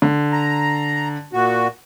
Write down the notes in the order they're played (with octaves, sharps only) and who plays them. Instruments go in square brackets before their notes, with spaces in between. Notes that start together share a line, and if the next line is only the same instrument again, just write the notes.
[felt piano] D3
[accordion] A#5
A#2 F#4